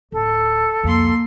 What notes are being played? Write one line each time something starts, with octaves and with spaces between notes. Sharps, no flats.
D1 A4
C2 F2 A#3 C6